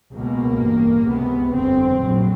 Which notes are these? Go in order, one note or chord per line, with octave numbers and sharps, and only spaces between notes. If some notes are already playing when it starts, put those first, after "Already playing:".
C#2 B2 A#3
A1 G2
C#2 C3 B3
G1 F2 C#3 C4
A#1 A2 F#3